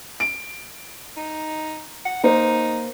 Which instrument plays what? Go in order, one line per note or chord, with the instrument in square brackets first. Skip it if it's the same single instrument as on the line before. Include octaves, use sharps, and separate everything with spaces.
[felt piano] D7
[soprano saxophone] D#4
F#5
[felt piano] A#3 C5 [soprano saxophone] D#4